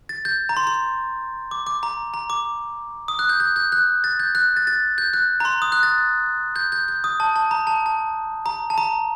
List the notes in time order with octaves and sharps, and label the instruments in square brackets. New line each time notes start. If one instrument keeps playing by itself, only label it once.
[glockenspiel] A6
G6
A#5
C6
C6
D6
D6
A#5
A#5
D6
D#6
F#6
G6
G6
G6
F#6
A6
G6
F#6
A6
A6
G6
F#6
A#5
C6
D#6
F#6
A6
G6
G6
G6
D#6
A5
A5
A#5
A5
A5
A#5
A5
A#5